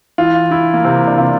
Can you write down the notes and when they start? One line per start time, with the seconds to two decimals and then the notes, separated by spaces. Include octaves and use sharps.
0.18 E3 F4
0.51 E3 E4
0.74 A#3
0.85 C3 C4
1.07 D4
1.18 C3 F4